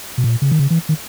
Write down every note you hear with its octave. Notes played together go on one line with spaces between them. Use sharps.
B2
A#2
C#3
D#3
C#3
E3
D#3